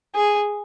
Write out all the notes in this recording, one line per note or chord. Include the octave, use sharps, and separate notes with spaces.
G#4